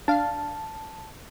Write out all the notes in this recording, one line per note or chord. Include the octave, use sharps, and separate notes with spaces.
D4 F5 A5